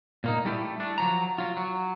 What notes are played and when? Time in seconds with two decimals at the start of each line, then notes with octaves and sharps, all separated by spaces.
0.24 A#2 A#3 D#4
0.45 G3 A3 E4 G4
0.80 A3 D4
0.98 F3 F#3 A#5
1.38 F#3 F4
1.57 F#3